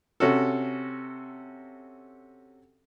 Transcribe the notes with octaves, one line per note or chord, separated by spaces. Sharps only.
C3 C#4 F#4 A4